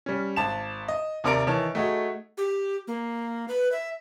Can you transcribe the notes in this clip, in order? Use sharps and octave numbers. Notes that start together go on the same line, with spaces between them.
G3 C#4
G#1 A5 E7
D#5
D#2 C3 A#4 D5 A#5 D7
D#3 E3 C#5 A5
A3 D#4 F#4 G#4
G4
A#3
B4
E5